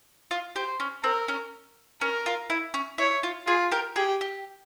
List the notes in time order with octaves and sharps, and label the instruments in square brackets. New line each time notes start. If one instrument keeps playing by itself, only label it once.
[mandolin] F4
[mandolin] G4 [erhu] C5
[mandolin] C#4
[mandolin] C4 [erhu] A#4
[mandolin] C#4
[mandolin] C#4 [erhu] A#4
[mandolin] F4
E4
C#4
[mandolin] E4 [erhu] C#5
[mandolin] F4
[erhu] F4 [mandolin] G#4
[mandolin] G4 A#4
[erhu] G4 [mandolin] G#4
[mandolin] G4